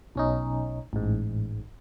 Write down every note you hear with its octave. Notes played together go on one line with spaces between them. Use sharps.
B1 C#4 D#4
A1 G#2